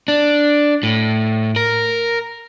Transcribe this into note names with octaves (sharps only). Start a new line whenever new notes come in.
D4
A2
A#4